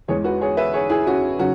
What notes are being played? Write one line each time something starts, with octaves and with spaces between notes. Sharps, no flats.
E2 E3 G#3 G#4 C#5
F#4 B4
G#4 C#5
B4 E5
G#4 C#5
E4 G#4
C#4 F#4
C#3 F#3 C#4 F#4